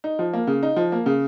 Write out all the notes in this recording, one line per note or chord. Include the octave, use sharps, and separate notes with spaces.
D#4
F3
A#3
C#3
D#4
F3
A#3
C#3